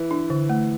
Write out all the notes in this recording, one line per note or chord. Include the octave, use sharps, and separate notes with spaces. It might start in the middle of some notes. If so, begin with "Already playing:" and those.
Already playing: E3
D4
D3
A3